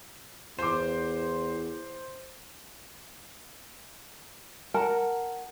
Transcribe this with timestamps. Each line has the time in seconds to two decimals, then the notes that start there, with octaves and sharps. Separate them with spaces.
0.59 E2 C5 D6
4.74 A#4 F#5 A5 A#5